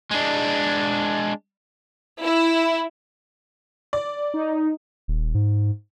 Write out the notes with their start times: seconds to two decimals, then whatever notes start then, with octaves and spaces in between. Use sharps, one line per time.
0.11 G#3 D4
2.22 E4
3.93 D5
4.34 D#4
5.08 D#1
5.34 G#2